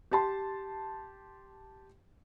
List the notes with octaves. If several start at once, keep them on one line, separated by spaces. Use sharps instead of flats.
G4 A5 C6